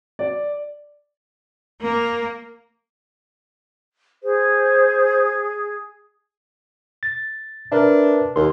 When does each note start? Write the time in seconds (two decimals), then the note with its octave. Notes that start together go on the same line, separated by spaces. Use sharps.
0.19 D5
1.81 A#3
4.23 G#4 C5
7.03 A6
7.72 D4 A#4 B4 E5
8.36 D#2 C6